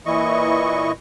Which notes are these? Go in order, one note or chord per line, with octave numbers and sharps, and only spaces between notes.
A#2 E3 E4 D#5 C#6